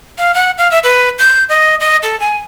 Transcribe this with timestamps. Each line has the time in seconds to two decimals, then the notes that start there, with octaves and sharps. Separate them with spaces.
0.18 F5
0.34 F#5
0.58 F5
0.71 E5
0.84 B4
1.19 G6
1.49 D#5
1.80 D#5
2.03 A4
2.20 G#5